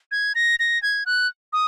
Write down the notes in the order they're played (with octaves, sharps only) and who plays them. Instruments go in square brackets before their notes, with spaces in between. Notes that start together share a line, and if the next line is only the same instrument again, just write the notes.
[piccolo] G#6
A#6
A#6
G#6
F#6
D#6